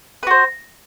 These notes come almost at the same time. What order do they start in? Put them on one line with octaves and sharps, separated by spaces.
B4 F#4 C5